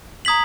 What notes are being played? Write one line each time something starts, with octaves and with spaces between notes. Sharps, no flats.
A#5 D#6 G#6 B6 F#7